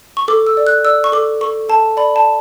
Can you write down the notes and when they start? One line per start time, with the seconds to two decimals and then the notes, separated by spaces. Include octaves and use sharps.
0.17 C#6
0.28 A4 D6
0.47 E6
0.57 D5
0.67 F#6
0.85 D5 E6
1.04 C#6
1.12 A4 D6
1.41 A4 C#6
1.69 A4 A5
1.97 D5 B5
2.16 A5